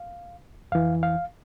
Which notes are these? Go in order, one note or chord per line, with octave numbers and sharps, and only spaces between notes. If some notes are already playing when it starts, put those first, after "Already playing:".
Already playing: F5
F2 E3 F5
F5